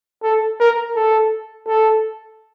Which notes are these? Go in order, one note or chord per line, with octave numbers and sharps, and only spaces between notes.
A4
A#4
A4
A4